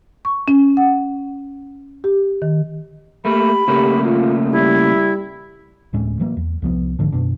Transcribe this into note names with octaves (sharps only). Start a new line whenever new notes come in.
C#6
C#4
F#5
G4
D#3
A3 A#3 G4 B5
C#3 A3 A#3 G4
F4
G3 E4
D1 A2 G#3 C#4
A2 E3 F#3 A#3
E2
C2 F3 B3
A1 G#2 D3 F3
F#2 B2 D4